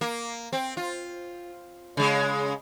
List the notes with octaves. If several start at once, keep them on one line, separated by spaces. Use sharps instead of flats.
A#3
C4
F4
C#3 G#3